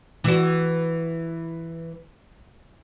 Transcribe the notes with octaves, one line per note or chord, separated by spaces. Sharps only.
E3 F#4